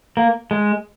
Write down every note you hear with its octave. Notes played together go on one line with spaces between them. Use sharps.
A#3
G#3